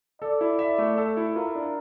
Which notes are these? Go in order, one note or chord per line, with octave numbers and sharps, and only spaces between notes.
A4 D5
E4
E5
A3
A4
E4
F4 A#4
D4